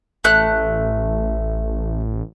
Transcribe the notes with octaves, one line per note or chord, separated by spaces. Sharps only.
A1 A3 F#6